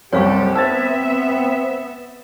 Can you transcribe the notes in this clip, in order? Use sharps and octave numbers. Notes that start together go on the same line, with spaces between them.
F#1 C2 C4 G4 A4 C#5 F5 C#6
B3 C5 E5 A5 E6 G#6 A6